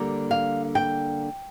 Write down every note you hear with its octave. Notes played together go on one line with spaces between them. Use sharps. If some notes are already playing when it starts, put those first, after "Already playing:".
Already playing: D3 G3 A#3
F5
G5